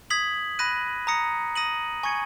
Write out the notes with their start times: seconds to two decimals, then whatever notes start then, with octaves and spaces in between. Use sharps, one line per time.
0.10 D#6 G#6 B6 F#7
0.59 B5 F#6 A#6 D#7
1.07 A#5 D#6 A#6 C#7
1.56 D#6 A#6 D#7 F#7
2.03 G#5 C#6 G#6 C#7